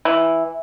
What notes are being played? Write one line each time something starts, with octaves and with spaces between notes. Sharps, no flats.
E3